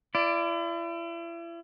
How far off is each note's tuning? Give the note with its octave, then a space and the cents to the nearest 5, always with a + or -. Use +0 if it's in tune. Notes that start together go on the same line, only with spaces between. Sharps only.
E4 +40 D5 +0